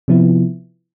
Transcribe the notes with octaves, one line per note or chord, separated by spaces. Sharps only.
C3 F3 B3 E4